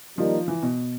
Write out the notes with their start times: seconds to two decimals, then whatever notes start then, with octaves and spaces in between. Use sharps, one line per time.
0.18 D#3 F3 G3 A#3 D#4
0.48 E3
0.63 B2